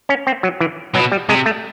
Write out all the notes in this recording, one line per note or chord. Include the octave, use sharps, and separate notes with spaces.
C#4
C4
F#3
E3
B2 F#3
G3
C3 G#3
A3